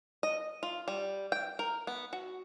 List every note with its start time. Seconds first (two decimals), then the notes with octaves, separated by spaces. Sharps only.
0.23 D#5
0.63 F4
0.88 G3
1.32 G5
1.59 A#4
1.87 B3
2.13 F#4